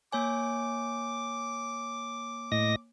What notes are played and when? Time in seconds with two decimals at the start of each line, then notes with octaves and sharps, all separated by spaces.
0.12 A#3 C#5 G#5 D6
2.52 A2 D#5 A#6